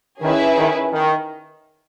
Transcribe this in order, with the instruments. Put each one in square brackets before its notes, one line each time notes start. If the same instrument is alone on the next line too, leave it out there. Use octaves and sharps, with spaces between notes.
[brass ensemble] D#3 [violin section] C#4 E4 G#4 B4 E5
[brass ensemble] D#3
D#3